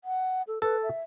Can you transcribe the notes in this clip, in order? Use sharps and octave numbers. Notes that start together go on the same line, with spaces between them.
F#5
A4
A4 B4
E5